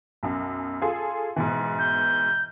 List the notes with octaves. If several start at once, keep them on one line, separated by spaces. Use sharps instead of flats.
B1 F#2
F4 G#4 A4
G#2 B2 E3
G6